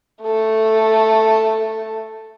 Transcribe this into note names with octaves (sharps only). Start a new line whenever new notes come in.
A3 A4